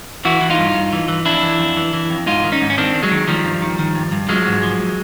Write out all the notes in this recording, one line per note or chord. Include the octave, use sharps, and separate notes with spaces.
E3 E4 F#4
E3
D#4 F4
G2
G2
E3
E3
F2 D4 E4
E3
F2
E3
E3
F2
G#2 D#4 F4
D#3
C#4 D#4
G#2
C#4
D#3 C4 D4
D#3
F#3 G#3
D#3
D#3 F3 G3
G2
D#3
D#3
G2
G2
F3 F#3 G#3
G#2
F3